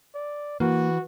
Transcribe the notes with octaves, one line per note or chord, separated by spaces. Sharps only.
D5
E3 A#3 F#4